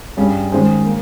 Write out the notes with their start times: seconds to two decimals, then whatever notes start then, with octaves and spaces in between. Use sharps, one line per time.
0.17 G2 G3 C#4 G#4
0.52 D#3 G#3 C#4 G#4 C5
0.85 A#3